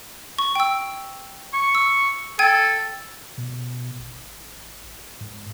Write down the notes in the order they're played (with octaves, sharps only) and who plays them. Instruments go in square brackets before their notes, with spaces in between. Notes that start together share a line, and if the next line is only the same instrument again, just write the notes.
[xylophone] C#6
G5 E6
[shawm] C#6
[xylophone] E6
[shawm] A4 [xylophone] G5 G#6 D#7
[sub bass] B2
G#1
G#2